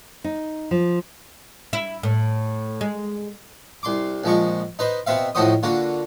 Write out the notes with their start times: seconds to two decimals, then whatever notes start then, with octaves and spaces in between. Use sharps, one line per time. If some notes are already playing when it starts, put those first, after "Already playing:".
0.24 D#4
0.71 F3
1.73 E4
2.03 A2
2.81 G#3
3.83 C2 C6 D6
4.24 A#1 F3 G#3 C#6
4.79 D#4 B4 C5
5.07 B2 C4 E5 F5
5.35 A2 F3 D#4 F#4 C5 D#6
5.63 D3 A#3 F4 F#4